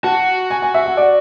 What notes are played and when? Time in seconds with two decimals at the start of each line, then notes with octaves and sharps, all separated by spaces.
0.03 F#4 A5
0.51 G#5
0.62 G#5
0.74 E5
0.86 F#5
0.97 D5